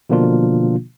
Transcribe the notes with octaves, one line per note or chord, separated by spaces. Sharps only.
B2 D3 F3 A#3 D4 F4